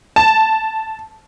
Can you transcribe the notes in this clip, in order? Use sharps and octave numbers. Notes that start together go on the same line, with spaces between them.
A5